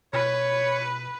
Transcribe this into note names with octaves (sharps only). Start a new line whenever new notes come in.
B2 B4 C#5